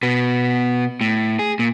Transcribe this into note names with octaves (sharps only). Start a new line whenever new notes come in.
B2 B3
A2
G#4
A#2